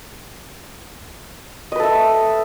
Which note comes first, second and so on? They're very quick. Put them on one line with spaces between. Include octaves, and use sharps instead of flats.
D#5 B4 A4 E5